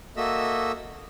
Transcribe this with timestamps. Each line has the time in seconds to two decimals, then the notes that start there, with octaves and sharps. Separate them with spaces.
0.17 A#3 F#4 A4 D#5 E5 E6